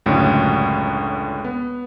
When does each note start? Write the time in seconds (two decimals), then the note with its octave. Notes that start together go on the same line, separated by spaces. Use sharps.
0.06 C#2 F#2 A2 D3
1.44 B3